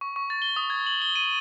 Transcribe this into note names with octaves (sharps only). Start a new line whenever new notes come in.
C#6
C#6
A6
G7
D#6
G#6
F#7
G7
D#7